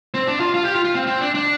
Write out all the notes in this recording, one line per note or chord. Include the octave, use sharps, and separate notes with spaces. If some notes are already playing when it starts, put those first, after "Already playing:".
C4
D4
F4
F4
G4
F4
F4
C4
C4
D4
D4